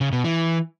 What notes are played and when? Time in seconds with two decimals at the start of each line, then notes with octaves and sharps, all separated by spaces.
0.01 C#3
0.13 B2
0.24 E3